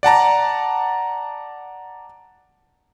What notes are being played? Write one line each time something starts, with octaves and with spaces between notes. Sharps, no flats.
D5 F#5 A5 A#5